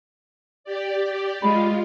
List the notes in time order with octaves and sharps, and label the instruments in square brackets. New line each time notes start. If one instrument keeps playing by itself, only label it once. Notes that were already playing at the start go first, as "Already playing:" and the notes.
[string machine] G4 D5
[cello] G#3 [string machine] F4 [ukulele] B5